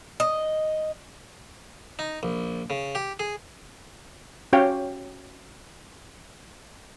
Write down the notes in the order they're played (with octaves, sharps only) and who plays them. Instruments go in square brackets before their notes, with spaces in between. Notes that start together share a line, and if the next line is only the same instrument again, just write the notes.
[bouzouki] D#5
[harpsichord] D#4
A#1
C#3
G4
G#4
[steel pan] C#4 F#4 G4 C#5 F5 G5